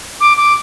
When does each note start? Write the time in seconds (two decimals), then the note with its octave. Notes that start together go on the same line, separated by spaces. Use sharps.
0.20 D6
0.37 D6